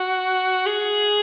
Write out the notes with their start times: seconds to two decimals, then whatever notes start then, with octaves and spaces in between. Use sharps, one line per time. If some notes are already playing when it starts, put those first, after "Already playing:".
Already playing: F#4
0.66 G#4